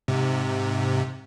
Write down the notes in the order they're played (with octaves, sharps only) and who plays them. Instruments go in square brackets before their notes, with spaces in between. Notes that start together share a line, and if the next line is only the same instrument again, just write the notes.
[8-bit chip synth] G#2 C3